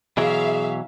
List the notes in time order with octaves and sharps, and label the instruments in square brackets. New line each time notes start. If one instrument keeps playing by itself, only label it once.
[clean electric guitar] B2 E3 F#3 [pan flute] G#4 [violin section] E5 F5